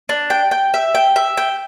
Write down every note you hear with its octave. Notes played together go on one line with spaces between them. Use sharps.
D4
G5
G5
E5
G5
E5
G5